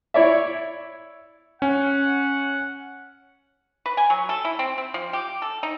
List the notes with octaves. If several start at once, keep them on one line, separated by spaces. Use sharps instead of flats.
E4 C#5 D5 E5
C#4 F#5
B4
G#5
F#3
A4
E4
C4
C4
F3
G4
A4
D#4